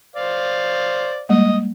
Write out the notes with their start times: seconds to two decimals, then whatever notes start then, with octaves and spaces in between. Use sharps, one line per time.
0.16 C5 D5 F5
1.29 G3 G#3 A#3 D#5